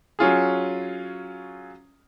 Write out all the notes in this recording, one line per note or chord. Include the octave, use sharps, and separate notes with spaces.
F#3 C#4 F4 G#4